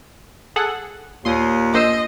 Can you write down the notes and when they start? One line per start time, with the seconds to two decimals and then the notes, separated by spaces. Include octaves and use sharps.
0.56 G#4 A4 F#5
1.25 D#2 A#2 C6 D#6
1.73 A#1 C5 D#5 E6